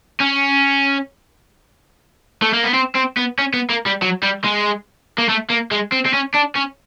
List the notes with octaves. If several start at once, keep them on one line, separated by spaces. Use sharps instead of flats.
C#4
A3
A#3
B3
C4
C4
B3
C#4
B3
A#3
G3
F#3
G3
G#3
A#3
A3
A#3
G#3
C4
C4
C#4
D4
C#4